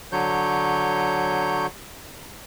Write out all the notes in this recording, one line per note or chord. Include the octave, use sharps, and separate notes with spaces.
D3 F#3 C#5 G6